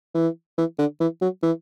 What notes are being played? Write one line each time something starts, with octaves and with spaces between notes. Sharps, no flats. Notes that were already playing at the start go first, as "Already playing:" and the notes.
E3
E3
D3
E3
F#3
E3